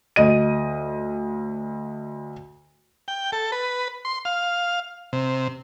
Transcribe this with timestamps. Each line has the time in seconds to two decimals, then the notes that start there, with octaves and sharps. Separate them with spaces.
0.16 D2 D#5 D#7
3.08 G5
3.32 A4
3.52 B4
4.05 C6
4.25 F5
5.13 C3